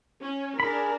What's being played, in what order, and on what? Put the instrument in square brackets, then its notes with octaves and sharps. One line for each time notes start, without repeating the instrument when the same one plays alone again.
[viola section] C#4
[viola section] D4 A#4 [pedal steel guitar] G#4 B5